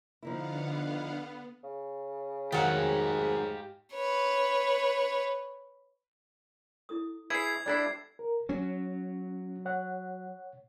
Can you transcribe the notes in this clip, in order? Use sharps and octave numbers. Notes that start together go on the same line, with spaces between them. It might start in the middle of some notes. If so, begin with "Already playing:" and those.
D3 F3 B3 D#4 E4 F5 F#5
C#3
G#2 D#3 F#3 G4 F5 F#5
B4 C#5
E4 A4 D#6
E4 G#4 B4 G#6 C7
G3 D4 E4 A4 D5
A#4
F#3 C#4
C#5 F#5